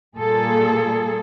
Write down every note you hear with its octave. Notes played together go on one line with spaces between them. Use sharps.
A#2 G3 A#3 G#4 A4